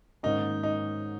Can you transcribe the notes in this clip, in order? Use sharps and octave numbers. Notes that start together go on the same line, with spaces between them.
G#2 D#3 A#3 C#4 D#4
D#4